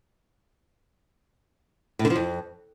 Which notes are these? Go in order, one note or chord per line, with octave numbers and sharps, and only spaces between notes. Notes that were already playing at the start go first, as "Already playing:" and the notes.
A2
D3
F3
F2